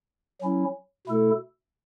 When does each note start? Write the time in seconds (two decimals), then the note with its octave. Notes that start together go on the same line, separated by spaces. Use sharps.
0.41 F#3 C#4 E4
1.07 B2 A3 E4 A4